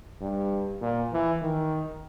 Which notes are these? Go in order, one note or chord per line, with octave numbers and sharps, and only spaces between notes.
G2
A#2
E3
D#3